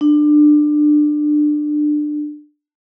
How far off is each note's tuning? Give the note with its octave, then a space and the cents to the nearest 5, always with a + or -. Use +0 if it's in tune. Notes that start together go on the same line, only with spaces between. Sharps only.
D4 +25